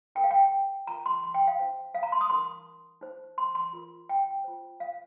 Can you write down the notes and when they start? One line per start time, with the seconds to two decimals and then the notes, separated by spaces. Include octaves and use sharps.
0.15 D#4 A#4 G5
0.24 F5
0.31 G5
0.87 F4 A#4 A#5
1.06 C6
1.23 C6
1.34 G5
1.47 F5
1.59 D#4 C5
1.95 F5
2.03 A#5
2.12 C6
2.21 D#6
2.30 D#4 A#4 C6
3.01 D#4 C5
3.38 C6
3.55 C6
3.73 F4 A#4
4.09 G5
4.44 F4 C5
4.80 F5